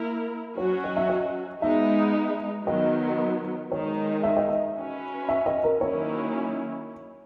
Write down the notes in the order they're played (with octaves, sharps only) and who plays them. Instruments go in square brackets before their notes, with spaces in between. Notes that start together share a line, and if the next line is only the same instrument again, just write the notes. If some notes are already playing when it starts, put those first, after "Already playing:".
Already playing: [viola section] A#3 E4 A#4
[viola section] F#3 C#4 F#4 [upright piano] C#5
[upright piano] D#5
E5
D#5
[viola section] G#3 B3 D#4 [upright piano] E5
[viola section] D#3 F#3 B3 [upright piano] D#5
[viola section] D#3 G#3 D#4 [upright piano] C#5
[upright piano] E5
D#5
E5
[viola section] C#4 F#4 B4
[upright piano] E5
D#5
A#4
[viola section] D#3 F#3 A#3 C#4 E4 [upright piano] C#5